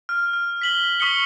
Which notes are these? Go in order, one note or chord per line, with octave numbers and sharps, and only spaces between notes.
F6
F6
B6 F#7 G7
C#6 D#6 B6 C#7 G7